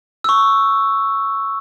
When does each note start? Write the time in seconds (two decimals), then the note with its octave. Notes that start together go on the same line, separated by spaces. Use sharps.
0.24 C#6 E6